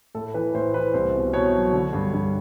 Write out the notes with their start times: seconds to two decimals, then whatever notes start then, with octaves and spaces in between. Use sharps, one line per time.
0.15 A2 A4
0.34 E3 B4
0.54 A2 C5
0.74 E3 B4
0.94 C2 C5
1.14 B2
1.33 B2 C#5
1.54 F#3
1.73 D3
1.93 G2
2.14 G2